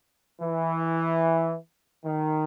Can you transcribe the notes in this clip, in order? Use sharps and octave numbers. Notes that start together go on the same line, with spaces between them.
E3
D#3